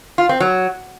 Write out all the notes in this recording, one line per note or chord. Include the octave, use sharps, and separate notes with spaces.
F4
C4
F#3